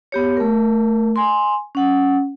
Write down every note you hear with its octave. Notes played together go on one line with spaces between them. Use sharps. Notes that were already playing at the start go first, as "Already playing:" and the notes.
B3 G4 C#5
A3 A#4
G#5 C6
C#4 F#5